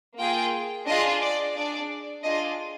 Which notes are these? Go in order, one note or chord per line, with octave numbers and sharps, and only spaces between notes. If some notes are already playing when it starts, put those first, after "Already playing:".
A#3 F4 G#4 G5
D4 F4 G#4 D#5
D5
D4 G#4 D5
D4 F4 G#4 D#5